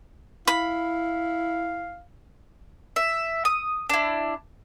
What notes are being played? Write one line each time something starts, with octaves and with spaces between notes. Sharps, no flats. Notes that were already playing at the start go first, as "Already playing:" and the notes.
E4 F5 B5
E5
D#6
D4 E4